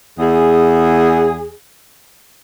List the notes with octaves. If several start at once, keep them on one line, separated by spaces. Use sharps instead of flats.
E2 G#4